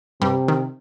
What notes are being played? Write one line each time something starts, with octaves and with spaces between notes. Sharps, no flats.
G2 C3 G3
D#3